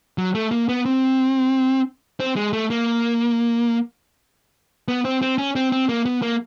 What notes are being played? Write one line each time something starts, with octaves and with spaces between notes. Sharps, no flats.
F#3
A3
A#3
B3
C4
C4
G#3
A3
A#3
B3
C4
C4
C#4
C4
C4
A#3
B3
A#3